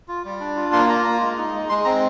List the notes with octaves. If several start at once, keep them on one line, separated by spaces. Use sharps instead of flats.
F4
G3
D4
F4
A#3 C6
F4 A#5
A#3 A#5
G#3
D#4
G#3
G#3 C6
C4 A#5